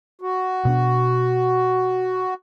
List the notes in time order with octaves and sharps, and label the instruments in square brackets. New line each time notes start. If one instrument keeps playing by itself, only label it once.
[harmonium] F#4
[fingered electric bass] B2 B3 D4